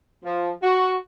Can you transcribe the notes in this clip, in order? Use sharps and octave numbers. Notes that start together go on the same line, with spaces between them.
F3
F#4